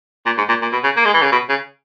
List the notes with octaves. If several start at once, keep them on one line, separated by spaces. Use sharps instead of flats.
A#2
G#2
A#2
A#2
B2
C#3
A#3
G#3
E3
C#3
B2
C#3